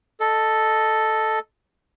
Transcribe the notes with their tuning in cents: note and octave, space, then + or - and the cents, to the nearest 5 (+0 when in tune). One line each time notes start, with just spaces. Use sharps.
A4 +0 D#5 -5